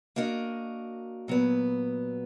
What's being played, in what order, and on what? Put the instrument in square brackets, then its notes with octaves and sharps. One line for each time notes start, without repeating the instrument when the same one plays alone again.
[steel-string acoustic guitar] A#3 D4 F#4 A#4 D#5
A#2 F#3 B3